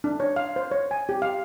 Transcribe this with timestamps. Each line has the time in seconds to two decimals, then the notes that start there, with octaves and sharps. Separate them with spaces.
0.04 D4
0.20 C#5
0.36 F5
0.56 C5
0.72 C#5
0.91 G#5
1.09 G4
1.22 F5